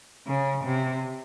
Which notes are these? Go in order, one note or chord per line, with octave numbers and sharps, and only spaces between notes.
C#3
C3